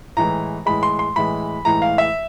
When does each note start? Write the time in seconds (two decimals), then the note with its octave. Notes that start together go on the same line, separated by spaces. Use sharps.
0.17 A2 E3 G#3 A#5
0.66 A2 E3 G#3 B5
0.83 C6
0.99 C6
1.16 A2 E3 G#3 B5
1.65 A2 E3 G#3 A#5
1.82 F5
1.98 E5